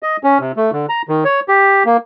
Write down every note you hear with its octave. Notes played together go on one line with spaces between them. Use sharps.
D#5
C#4
C3
A3
D3
A#5
D#3
C#5
G4
A#3